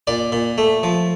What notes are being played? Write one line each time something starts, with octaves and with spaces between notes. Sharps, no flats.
A#2 D5
A#2
A3
F3